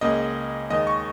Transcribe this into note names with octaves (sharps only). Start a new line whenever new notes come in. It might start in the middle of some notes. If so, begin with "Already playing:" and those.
C#2 C#3 A#3 D#5
D#2 D#3 G#3 D#5
C#6